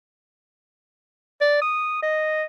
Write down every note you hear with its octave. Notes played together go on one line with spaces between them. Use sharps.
D5
D#6
D#5